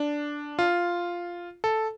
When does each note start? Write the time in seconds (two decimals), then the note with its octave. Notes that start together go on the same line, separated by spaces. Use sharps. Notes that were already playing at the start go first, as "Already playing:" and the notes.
Already playing: D4
0.59 F4
1.64 A4